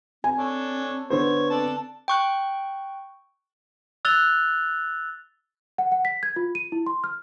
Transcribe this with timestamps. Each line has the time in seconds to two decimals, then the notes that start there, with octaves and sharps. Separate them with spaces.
0.24 C4 G#5
0.38 D4 A4 C#5
1.10 D3 B3 C5 C#5
1.50 C4 A4 D5 A5
2.08 G5 C#6 F#6
4.05 E6 F#6 A6 F7 G7
5.78 F#5
5.92 F#5
6.05 B6
6.23 G#6
6.36 F4
6.55 D#7
6.72 E4
6.86 C6
7.04 F6